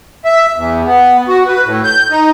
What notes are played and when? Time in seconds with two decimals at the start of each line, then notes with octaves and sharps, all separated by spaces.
0.25 E5
0.56 E2
0.85 B3
1.28 F#4
1.46 B4
1.64 A2
1.84 G6
2.10 D#4